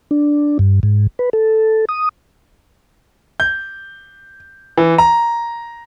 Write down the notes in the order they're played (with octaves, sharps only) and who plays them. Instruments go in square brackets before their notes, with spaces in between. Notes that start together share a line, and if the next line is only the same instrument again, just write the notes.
[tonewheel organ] D4
G2
G#2
B4
A4
D#6
[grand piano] G6
E3
A#5